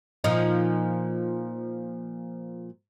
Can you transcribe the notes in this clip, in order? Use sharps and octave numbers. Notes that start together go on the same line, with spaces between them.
A#2 F3 D#4